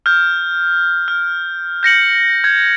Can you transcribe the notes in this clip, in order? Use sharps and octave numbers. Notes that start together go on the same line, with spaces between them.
F6 G6
F6
G6 A#6 C#7 F#7
G6 G#6